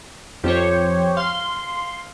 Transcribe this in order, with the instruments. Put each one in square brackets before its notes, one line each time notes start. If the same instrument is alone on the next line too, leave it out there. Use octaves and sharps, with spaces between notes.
[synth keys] F2 F3 [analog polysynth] G4 C5 C#5
[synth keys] F5 [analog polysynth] C6